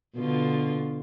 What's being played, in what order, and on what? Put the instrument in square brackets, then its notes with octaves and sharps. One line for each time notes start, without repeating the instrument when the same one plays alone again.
[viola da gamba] B2 D3 F4